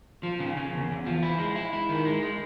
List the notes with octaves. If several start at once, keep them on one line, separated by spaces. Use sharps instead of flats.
F3
C#3
C#3
E2
E2
F3
E4
G#3
E4
E4
D#3
G#3
G#3